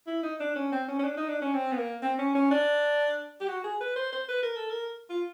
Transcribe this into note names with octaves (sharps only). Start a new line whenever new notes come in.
E4
D#4
D4
C#4
C4
C#4
C#4
D4
D#4
D4
C#4
C4
B3
A#3
C4
C#4
C#4
D4
G4
F#4
G#4
B4
C5
C5
B4
A#4
A4
A#4
F4